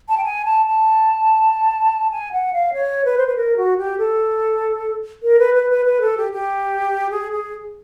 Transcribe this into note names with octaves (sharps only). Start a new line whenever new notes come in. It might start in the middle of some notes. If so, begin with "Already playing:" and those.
A5
G5
G#5
A5
A5
G#5
F#5
F5
C#5
B4
C5
B4
A#4
F#4
G4
A4
A#4
B4
B4
B4
B4
A4
G4
G4
G#4
G#4